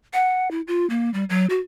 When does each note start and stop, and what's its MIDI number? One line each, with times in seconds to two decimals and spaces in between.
0.13 0.50 78
0.51 0.61 64
0.67 0.88 65
0.90 1.12 58
1.14 1.24 55
1.30 1.46 54
1.50 1.59 66